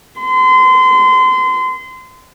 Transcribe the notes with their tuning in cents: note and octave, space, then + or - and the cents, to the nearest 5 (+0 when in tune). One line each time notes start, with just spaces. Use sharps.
C6 -30